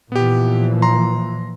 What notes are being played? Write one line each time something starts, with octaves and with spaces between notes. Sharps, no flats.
A#2 E3 F3 B3 G4
A#5 C6